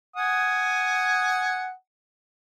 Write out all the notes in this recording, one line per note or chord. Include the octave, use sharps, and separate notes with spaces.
F#5 G#5 D#6